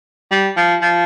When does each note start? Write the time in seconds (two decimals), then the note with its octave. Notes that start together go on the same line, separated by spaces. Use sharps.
0.31 G3
0.57 F3
0.82 F3